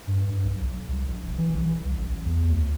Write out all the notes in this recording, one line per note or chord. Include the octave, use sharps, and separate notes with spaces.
G2
B1
B1
C2
A#1
E1
E3
B1
C2
A1
E2
D2